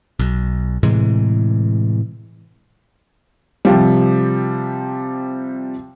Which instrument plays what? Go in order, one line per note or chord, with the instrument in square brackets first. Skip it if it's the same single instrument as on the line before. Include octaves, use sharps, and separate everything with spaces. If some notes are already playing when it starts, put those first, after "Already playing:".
[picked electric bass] B1
A2 C3 E3 G#3
[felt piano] C3 F3 G3